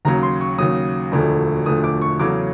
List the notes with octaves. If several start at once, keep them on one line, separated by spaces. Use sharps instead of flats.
D#2 C#3 F#3 A#5
C6
C#6
D#2 C#3 F#3 D#6
E1 D2 D3 F3 A3
E1 D2 D3 F3 A3 D#6
D6
C#6
E2 C#3 F#3 A3 C#4 D6